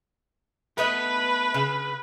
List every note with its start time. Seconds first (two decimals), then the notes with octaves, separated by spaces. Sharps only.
0.78 A3 B3 B4 D#5
1.54 C#3